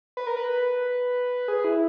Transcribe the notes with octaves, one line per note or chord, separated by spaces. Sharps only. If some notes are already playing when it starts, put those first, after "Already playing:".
B4
A#4
B4
G#4
E4